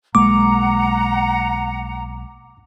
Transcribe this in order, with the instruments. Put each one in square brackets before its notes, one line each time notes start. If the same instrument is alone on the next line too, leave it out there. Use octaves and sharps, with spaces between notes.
[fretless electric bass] B1 G#3 A#3 [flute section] F#5 A#5 [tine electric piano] D6